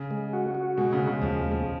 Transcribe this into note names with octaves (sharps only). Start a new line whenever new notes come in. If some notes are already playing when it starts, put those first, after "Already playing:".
Already playing: C#3
G#3
F#4
F#4
B2 G#3
C#3
G#3
C#3
D#2 F3
G#3
F3